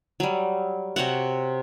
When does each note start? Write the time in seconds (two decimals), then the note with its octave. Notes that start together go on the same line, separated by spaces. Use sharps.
0.20 F#3 G3
0.96 C3 F#4 C#5 F#5